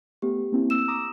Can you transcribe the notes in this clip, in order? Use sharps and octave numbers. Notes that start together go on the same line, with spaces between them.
A3 B3 G4
A#3 C4 E4
E6 E7
A#5 D6 D#6